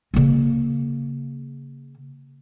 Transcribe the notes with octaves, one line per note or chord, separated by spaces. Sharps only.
C#3 A#3